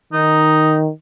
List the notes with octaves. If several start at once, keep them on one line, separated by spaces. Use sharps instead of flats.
D#3 D#4